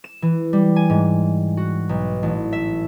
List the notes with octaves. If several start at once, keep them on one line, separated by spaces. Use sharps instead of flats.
E7
E3
G3
G#5
G#2
F#4
B1
A1
E5